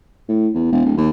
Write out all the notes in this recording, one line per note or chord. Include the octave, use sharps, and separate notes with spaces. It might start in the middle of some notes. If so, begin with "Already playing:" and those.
A2
E2
E1
D1
D#2